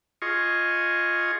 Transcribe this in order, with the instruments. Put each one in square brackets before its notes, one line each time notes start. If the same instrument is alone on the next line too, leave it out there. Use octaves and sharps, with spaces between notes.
[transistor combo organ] F4 G#4 D#5 C#6